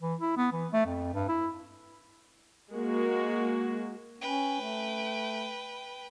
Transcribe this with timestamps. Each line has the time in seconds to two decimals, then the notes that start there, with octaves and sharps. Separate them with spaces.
0.02 E3
0.20 E4
0.37 B3
0.52 E3
0.73 A3
0.86 F2
1.14 G2
1.29 E4
2.71 G#3 A#3 F#4
4.21 C#4 B4 G5
4.61 A3